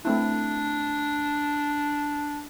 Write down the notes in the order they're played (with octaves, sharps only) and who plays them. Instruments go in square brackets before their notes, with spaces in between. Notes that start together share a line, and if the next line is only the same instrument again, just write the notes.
[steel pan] A3 C4 E4 [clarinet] D4